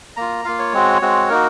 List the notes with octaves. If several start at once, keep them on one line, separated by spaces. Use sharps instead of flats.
A#3 F4 A#5
A#3 F4 F5
C#5
G#3 C4 F#4
G#3 C4 F#4
A#3 D#4 F#4 A#4